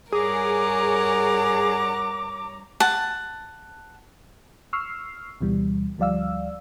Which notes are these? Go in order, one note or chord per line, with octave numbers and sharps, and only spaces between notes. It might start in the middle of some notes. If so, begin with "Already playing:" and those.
G2 G#4 A#4 C#5 F#5 A#5 D6
F#5 A5
C#6 E6 F6 C7
D2 B2 E3 G3
D2 F3 G3 D5 F5 E6